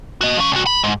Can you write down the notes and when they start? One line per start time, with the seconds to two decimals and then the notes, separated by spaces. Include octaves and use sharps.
0.21 F#4 D#5
0.37 F3 C#4
0.52 C2 F#4
0.67 B5
0.84 G#2